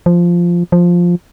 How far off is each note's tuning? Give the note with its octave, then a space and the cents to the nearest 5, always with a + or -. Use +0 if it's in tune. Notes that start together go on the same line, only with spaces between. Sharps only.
F3 -5
F3 +5